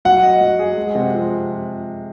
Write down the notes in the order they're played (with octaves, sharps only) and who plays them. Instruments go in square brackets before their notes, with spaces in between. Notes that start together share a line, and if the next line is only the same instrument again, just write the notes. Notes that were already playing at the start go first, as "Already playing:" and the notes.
[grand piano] F#3 [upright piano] F#5
[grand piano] D#5
F#3
G#4
G#3
C3
F3